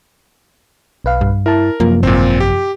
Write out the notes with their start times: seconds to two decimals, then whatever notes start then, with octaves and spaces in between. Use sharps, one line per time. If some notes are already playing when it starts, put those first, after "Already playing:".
1.04 B1 B4 F5
1.21 G2
1.46 E4 A#4 A5
1.80 F#2 C3 F3 A#3
2.03 G#1 A#2 C4
2.40 G4